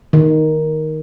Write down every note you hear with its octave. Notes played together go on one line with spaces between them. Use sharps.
D#3